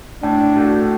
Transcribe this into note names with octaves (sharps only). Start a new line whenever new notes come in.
A2 D4
A3 F#4